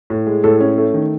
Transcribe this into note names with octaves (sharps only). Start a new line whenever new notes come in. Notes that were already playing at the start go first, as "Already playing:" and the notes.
A2
G#3
A2 A4
C#4
A3
D#3